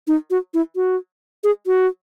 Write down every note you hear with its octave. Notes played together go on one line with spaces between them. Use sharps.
D#4
F#4
E4
F#4
G#4
F#4